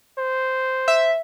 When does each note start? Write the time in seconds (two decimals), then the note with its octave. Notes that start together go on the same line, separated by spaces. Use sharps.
0.18 C5
0.88 E5